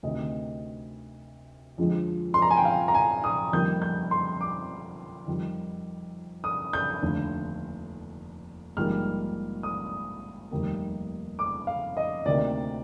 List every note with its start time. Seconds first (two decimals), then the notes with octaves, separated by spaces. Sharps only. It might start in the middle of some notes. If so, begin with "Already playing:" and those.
0.03 D2 C3 D#3 D#5
1.78 F2 D3 F3 G#3
2.34 C6
2.42 A#5
2.51 G#5
2.57 G5
2.65 F5
2.88 A#5
2.95 G#5
3.24 D#6
3.53 F2 D#3 G3 A#3 G6
3.82 G6
4.11 C6
4.41 D6
5.27 F2 D#3 G3
6.44 D#6
6.73 G6
7.02 F1 D#2 D3
8.77 A#1 G#2 D#3 G3 A#3 F6
9.63 D#6
10.51 F1 D#2 D#3 G3 A#3
11.39 D6
11.67 F5
11.97 D#5
12.25 D2 C3 D#3 A#3 D5